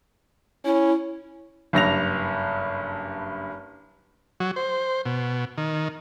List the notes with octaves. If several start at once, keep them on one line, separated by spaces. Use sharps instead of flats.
C#4 E4
F#1 G2 A#6 F7
F#3
C5
B2
D#3